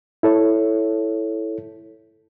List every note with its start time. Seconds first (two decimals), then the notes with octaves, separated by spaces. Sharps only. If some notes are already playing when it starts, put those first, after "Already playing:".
0.23 E4 A4 C#5